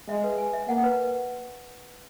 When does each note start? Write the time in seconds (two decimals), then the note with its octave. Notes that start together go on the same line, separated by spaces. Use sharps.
0.08 G#3 E5
0.24 B4
0.38 G#5
0.53 E5
0.68 A#3 F#5
0.84 B4